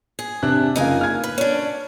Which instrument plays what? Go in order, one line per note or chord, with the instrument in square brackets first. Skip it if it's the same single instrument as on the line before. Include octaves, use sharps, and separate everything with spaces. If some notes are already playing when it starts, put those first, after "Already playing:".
[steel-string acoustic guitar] G#4
[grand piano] C3 D4 F#6
[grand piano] F#1 C#3 F4 [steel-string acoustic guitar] D#4 A#4 G#5
[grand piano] F6 G#6
[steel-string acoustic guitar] B4
C#4 D4